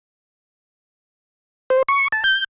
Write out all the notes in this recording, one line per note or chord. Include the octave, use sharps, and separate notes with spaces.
C5
C#6
A5
G6